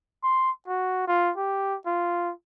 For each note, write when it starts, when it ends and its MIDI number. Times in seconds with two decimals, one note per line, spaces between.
0.23 0.51 84
0.68 1.04 66
1.07 1.32 65
1.37 1.77 67
1.86 2.32 65